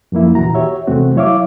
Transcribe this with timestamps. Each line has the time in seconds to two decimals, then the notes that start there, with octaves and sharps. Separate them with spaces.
0.12 F#2 F3 A#3 E4
0.35 D#2 A#2 E3 F#4 A#5
0.55 F#4 G4 C#5 E5
0.87 E2 C3 A3 C4 F#4
1.16 F#3 E4 C#5 E5 F5 D6